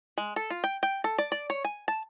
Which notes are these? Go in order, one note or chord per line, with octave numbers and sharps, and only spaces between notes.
G#3
A4
F4
G5
G5
A4
D5
D5
C#5
G#5
A5